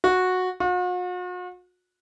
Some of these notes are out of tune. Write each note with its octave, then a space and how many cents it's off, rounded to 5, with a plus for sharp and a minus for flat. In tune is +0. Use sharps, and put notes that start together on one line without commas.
F#4 -10
F#4 -45